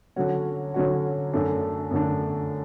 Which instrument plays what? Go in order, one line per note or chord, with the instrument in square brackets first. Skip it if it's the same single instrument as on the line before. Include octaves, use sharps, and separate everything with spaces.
[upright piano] D3 F#3 C#4 F#4
D3 F#3 C#4 F#4
F#2 D3 A3 D4
F#2 D3 A3 D4